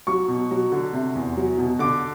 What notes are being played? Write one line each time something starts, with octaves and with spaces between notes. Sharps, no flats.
F#3 C#6
B2
F#3
D3
C3
E2
F#3
B2
D3 D6